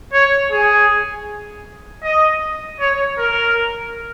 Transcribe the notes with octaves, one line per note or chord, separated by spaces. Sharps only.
C#5
G#4
D#5
C#5
A#4